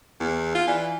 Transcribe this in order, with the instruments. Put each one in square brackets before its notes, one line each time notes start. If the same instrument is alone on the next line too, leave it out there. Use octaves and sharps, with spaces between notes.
[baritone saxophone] E2
F4
[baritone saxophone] E3 [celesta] D5 G#5